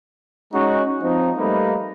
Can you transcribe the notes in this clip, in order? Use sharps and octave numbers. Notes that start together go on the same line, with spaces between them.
G#3 C#4 D#4 F#4
F3 C4 D#4
G3 A3 A#3 D#4 B4